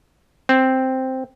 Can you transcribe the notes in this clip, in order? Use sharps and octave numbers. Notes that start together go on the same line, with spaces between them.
C4